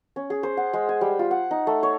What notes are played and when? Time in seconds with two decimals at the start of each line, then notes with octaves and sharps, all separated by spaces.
0.16 C#4
0.30 G#4
0.43 C5
0.57 F#5
0.73 G#3
0.89 G#5
1.01 G3
1.19 F4
1.31 F#5
1.51 D#4
1.67 A3
1.83 C#5